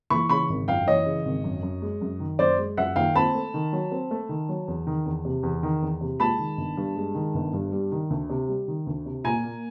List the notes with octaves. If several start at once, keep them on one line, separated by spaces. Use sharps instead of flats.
E3 B5 C#6
C#3 B5 C#6
G#1
F#2 F5 G5
E3 C#5 D#5
C#3
G#1
F#2
F#2
G#3
F#2
D#3
F#2 C5 D5
G#3
F#2 E5 F#5
D#3 F5 G5
C4 A5 B5
A3
D#3
F#3
C4
A3
D#3
F#3
E2
D#3
E2
C3
E2
D#3
E2
C3
G#3 A5 B5
D#3
G1
G2
G#3
D#3
G1
G2
G3
D#3
D2
C3
G3
D#3
D2
C3
A#2 G#5 A#5
A#3